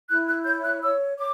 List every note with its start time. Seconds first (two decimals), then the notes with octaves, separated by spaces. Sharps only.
0.10 E4 F#6
0.28 F#6
0.46 C#5 G6
0.64 F#6
0.82 C#5 E6
1.18 C#5 D6